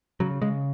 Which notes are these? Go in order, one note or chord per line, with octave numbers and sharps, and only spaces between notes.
C#3 F#3
C#3 G#3